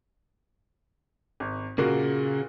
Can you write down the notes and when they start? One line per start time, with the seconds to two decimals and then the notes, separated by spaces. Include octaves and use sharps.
1.40 G#1
1.78 A#2 C#3 A#3 F#4